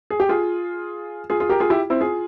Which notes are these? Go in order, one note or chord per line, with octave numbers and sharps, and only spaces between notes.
G#4
G4
F4 G#4
F4 G#4
F4 G#4
G4 A#4
F4 G#4
E4 G4
C4 E4
F4 G#4